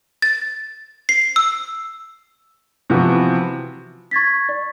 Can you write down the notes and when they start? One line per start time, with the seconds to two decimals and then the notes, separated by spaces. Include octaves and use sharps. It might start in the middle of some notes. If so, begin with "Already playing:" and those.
0.22 A6
1.09 C7
1.36 E6
2.90 C3 E3 F3 B3 F#4
4.11 C#6 G#6 A6 B6
4.49 D5